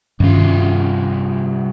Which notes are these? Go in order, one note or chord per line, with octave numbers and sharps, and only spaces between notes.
C2 G2 D#3 C#4 F4